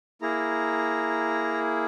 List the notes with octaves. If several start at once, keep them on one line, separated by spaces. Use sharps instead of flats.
A#3 E4 G#4 A#5